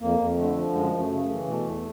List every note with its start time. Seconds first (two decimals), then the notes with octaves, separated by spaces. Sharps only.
0.01 F2 A#3
0.19 F2
0.38 D3 A3
0.56 F3
0.74 F#2 G#3
0.93 F#2
0.98 A3
1.11 C#3
1.23 A3
1.30 E3
1.47 B2 A3
1.66 E2